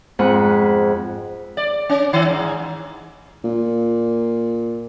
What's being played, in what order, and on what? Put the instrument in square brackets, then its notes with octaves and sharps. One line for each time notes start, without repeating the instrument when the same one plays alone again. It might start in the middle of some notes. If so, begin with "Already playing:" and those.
[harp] F2 G#2 G#4 F#5 B5
[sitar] D5
C#4
D#3
G#2
[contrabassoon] A#2